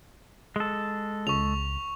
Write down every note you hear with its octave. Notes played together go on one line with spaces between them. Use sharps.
G#3 A4
C#2 C#6 F7